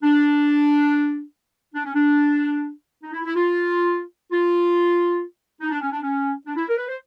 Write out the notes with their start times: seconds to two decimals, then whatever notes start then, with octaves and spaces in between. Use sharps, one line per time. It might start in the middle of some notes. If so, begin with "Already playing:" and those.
0.03 D4
1.74 D4
1.84 C#4
1.93 D4
3.03 D#4
3.13 E4
3.25 E4
3.34 F4
4.31 F4
5.60 D#4
5.70 D4
5.81 C#4
5.91 D4
6.02 C#4
6.46 D4
6.56 E4
6.68 A#4
6.77 B4
6.88 C5